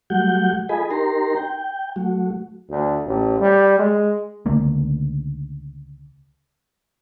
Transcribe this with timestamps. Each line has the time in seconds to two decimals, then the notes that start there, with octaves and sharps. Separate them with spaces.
0.10 F#3 G3 A3 F#4 F#5 G6
0.69 F4 G#4 A4 D#5 G#5 B5
0.91 D#4 G4 A#4 A#5 C6
1.36 G5
1.96 F#3 A3 F#4
2.70 D2
3.06 A1
3.40 G3
3.79 G#3
4.46 C#2 D3 A3 A#3